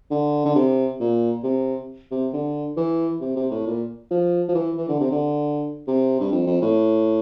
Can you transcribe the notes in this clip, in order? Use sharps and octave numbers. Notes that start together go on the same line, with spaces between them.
D3
D3
C3
A#2
C3
C3
D3
E3
C3
C3
A2
A#2
F3
F3
E3
E3
D3
C3
D3
C3
G2
F2
F2
A2